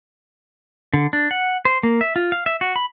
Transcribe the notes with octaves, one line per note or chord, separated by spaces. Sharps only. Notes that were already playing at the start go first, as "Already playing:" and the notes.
D3
D4
F#5
C5
A#3
E5
F4
F5
E5
F#4
B5